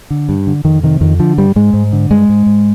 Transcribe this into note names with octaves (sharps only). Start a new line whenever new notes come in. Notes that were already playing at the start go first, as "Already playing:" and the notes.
D3
G2
D3
F2 D#3
C3 D#3
F2 D#3
D3 F3
G2 G3
G#2 G#3
G#2
D3
G2 G#3
G#2
G#2